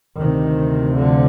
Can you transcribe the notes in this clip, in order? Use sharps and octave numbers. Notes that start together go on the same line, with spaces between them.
D2 C3 D#3
D3 F3